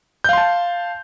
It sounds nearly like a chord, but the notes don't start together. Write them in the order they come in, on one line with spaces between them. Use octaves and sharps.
G6 F5 C6 A5